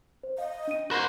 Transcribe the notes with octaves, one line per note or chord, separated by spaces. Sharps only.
C5
D#5 F5
D4 D#7
A#4 C5 F#5 B5 F#6 E7